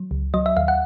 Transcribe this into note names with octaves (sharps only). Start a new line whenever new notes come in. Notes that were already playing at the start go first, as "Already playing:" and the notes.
Already playing: F#3
C#2
F#3 D#5
E5
D#2 F5
F#5